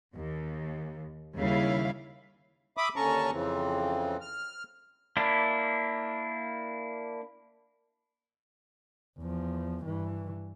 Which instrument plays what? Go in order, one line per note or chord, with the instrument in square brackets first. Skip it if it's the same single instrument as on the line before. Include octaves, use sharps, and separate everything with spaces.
[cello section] D#2
D#2 C#3 G3 E4 F5
[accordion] E5 B5 D6 D#6
D#2 D3 C#4 A5 A#5 C#6
F2 C#3 E3 C4
F6
[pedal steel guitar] A#3 D4 E4
[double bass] E2 F3
G2 E3